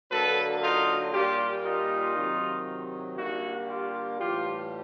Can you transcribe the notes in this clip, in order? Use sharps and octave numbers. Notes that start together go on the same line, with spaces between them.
D3 F#3 A#3 A4 B4
D#4 F4
A#2 G3 A#3 F4 G4
D#4 F4
C3 D#3 F#3
D3 G3 A#3 E4 F#4
F4 G4
A2 E3 G3 F4 G4